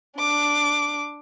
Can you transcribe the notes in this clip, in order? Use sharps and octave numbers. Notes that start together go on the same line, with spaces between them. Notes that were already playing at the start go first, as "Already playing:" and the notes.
D4 D6